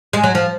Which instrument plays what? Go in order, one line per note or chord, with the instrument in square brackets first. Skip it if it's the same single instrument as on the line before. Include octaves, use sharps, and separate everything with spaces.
[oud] G#3
F#3
F3